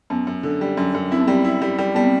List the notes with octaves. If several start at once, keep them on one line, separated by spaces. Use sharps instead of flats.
F#2 B3
F#2
D3
G3
F#2
F#2
C4 E4
B3
G3 C4
E4
G3
G3
G3 B3
C4